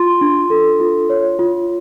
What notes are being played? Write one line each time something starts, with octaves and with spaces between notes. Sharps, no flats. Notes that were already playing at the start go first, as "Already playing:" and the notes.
Already playing: F4 C6
D4
A4
F4
C#5
F4